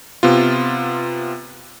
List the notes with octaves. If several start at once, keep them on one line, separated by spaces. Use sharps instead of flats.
C3 B3 F4